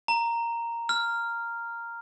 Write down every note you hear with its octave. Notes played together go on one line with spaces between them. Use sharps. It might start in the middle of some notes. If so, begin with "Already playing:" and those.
A#5
F6